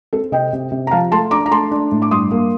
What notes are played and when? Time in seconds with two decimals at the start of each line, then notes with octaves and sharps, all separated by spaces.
0.13 C4 A4
0.32 C3 D#5 G5
0.53 C3
0.72 C3
0.87 A#5
0.91 F3 F5 A5
1.12 A3 A5 C6
1.31 D4 A#5 D6
1.46 A#5
1.51 A3 A5 C6
1.71 D4
1.91 A2
2.02 D6
2.11 G2 C6 D#6
2.31 A#3